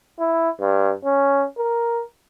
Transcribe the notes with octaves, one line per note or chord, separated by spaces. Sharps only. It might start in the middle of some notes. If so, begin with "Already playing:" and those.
E4
G2
C#4
A#4